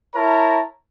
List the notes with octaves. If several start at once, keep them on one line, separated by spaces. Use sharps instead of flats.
E4 A#4 C#5 A5 A#5